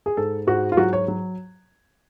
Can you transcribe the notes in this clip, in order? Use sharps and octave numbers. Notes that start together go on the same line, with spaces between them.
G#4
G#2 A4
G#2 F#4
F4
F#3 F#4
C#5
F#3